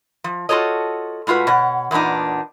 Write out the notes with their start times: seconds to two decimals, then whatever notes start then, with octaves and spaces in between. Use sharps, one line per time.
0.24 F3
0.49 F4 F#4 A4 C#5 D#5
1.27 A2 G#3 F4 F#4 B4
1.47 B2 C#5 F#5
1.91 E2 A#2 B3 D4 D#4